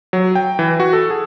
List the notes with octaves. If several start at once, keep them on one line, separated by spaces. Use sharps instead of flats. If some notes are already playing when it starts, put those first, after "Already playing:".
F#3
G5
E3
F#4
A4
G#4